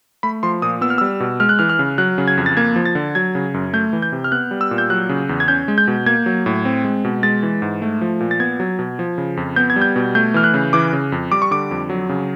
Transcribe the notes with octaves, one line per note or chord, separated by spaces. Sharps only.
A3 B5
F3 C6
A#2 D#6
B3 E6
F6
G3 E6
B2
G#3 F6
F#6
E3 F6
F6
C#3
F#3 F#6
C#3
G#6
F2
A6
A#3 G#6
F3
A6
D3
F#3 G#6
C#3
F#2
A3 G6
E3
G6
C3
F6
B3 F#6
G3
E6
A#2
G6
F#3 F#6
C#3
E2
G#6
C#4 G6
G#3
G6
B2
A#3 G#6
F#3
A2
C4
G#3
B2
G#3 A6
E3
G#2
A3
F3
A#2
A6
B3 G#6
F#3
B2
F3
C#3
F2
B3 G6
G#6
G3
G6
B2
A3 G6
E3 F6
F#6
C#3
E3 D6
C#3
F2
G3 D6
C#6
D3 D6
F2
F#3
C#3